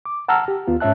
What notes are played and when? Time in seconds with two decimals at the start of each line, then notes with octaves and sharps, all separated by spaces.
0.05 D6
0.28 F#5 A5 A#5 E6 F6
0.48 G4
0.68 D#2 B3 F4
0.80 G#2 C#4 C#5 E5 A5 F#6